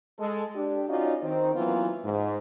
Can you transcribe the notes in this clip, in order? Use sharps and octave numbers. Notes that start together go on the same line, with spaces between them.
G#3 A4
D4 G4
C#4 D#4 F4 F#4 D5 D#5
D#3 C4 D#4
E3 F#3 A#3 B3 C#4 F4
G#2